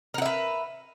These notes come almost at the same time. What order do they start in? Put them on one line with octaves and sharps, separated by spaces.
A#4 F#5 E5 B4